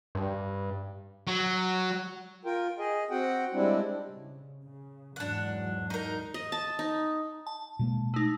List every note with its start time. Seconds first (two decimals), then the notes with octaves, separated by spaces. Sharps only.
0.15 G2
1.27 F#3
2.45 F4 A#4 G5
2.79 G#4 D#5
3.10 C4 F#4 F#5 G5
3.54 G3 G#3 C4 D4 E4
4.09 C#3
4.63 C#3
5.16 E2 G#2 F#3 D4 F#5
5.90 D#4 A#4
6.34 D#5
6.52 A5
6.79 D#4
7.47 A5
7.79 B2 G#3 A#3
8.14 A3 D#4